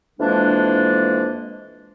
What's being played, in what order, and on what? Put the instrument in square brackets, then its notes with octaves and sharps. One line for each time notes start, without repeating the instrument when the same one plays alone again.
[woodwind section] F2 E3 G#3 A#3 D4